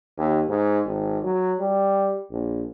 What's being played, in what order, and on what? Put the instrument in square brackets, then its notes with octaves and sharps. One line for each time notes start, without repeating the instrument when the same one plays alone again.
[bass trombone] D#2
G#2
G#1
F#3
G3
A#1